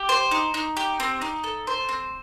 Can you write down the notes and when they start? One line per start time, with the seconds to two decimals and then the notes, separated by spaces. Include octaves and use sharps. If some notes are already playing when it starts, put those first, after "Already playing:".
Already playing: G4
0.09 C5
0.31 D#4
0.54 D#4
0.77 G4
1.00 C4
1.21 D#4
1.44 A4
1.67 C5
1.89 C4